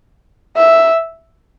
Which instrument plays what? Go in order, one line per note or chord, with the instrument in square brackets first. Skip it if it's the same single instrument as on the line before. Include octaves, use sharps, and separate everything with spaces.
[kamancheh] E5